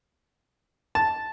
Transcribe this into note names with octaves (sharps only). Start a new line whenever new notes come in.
A5